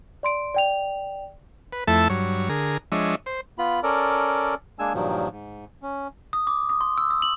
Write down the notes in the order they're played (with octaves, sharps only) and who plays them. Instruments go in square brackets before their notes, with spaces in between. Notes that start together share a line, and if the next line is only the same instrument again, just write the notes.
[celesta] D5 C6 D7
D5 G5 F7
[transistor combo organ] B4
F2 A3 E4 A4 E5 A5
G2 F#3 C#5
D3 G#4 A#4
F3 G#3 D4 C#5 D#5 E5
C5
[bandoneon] B3 F4 B5
C#4 A4 A#4 D5
G#3 A#3 D4 G#5 E6
G2 A#2 D#3 F3 F#3
G#2
C#4
[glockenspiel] D#6
D6
D#6
C6
E6
D#6
F#7